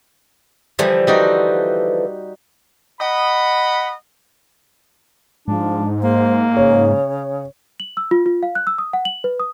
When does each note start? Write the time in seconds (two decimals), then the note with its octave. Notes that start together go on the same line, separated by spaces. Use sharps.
0.79 D3 E3 F3 G3
1.07 G3 D#4 F#4
3.01 D#5 F#5 B5
5.48 G#2 F3 D4
6.03 A#3 C5
6.57 C#3 C#5
7.80 F#7
7.97 E6
8.11 F4
8.26 F4
8.43 F5
8.55 F#6
8.67 E6
8.78 D#6
8.93 F#5
9.05 F#7
9.24 B4
9.40 D#6